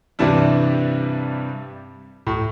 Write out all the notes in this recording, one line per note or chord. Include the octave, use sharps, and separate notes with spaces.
G2 C3 E3 G3 D4 E4
A2